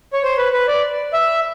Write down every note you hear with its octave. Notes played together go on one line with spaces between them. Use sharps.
C#5
C5
B4
B4
D5
E5